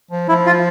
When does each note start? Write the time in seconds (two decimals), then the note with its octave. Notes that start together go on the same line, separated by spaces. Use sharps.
0.11 F3
0.29 F3 E4
0.46 F4